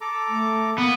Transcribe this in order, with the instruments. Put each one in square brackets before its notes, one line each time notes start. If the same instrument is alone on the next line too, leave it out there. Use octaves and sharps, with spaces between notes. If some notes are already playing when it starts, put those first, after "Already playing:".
[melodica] A4 A#5 D6
[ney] A3
[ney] A#3 [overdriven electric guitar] B3